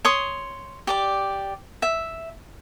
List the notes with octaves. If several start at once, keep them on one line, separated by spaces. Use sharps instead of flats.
C#5 C6 D#6
G4 D5 D6
E5